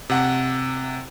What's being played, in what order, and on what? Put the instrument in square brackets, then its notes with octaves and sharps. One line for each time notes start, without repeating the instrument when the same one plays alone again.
[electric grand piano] C3 F#5